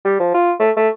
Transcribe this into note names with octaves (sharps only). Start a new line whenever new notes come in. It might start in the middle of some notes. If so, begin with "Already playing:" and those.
G3
F3
F4
A3
A3